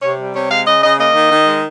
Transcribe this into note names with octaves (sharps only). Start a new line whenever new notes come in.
C3 C#5
G3
C3 C#5
G#3 F5
C#3 D#5
C#3 D#5
A#3 D#5
D#3
D#3
G#3